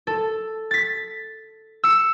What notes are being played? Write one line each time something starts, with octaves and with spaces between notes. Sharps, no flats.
A4
A6 B6
E6 C#7